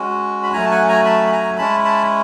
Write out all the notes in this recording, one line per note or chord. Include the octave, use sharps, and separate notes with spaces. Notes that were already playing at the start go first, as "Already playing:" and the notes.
Already playing: G#3 C#4 F#4
B5
F#3 A3 C#4 G#5 A#5
A5
F#5 G#5
G#5 A#5
A5 B5
B5
G#5 A#5
G#3 C#4 E4 A5 B5
A5 B5